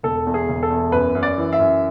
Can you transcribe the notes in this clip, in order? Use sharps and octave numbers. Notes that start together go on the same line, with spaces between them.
E1 A4
E2
G#4
E1
A4
E2
F#2 B4
F#2
D5
E3
E5
F#2